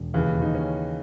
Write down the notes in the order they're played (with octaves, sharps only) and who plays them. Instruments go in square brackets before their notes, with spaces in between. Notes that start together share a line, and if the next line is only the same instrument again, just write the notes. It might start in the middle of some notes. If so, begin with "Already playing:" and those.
Already playing: [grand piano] E1
[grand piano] D#2 [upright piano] C#3 E3
[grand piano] D#2 [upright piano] D#4
[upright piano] C#4